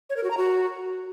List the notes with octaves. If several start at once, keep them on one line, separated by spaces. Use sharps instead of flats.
C#5
A#4
F#4
A#5
F#4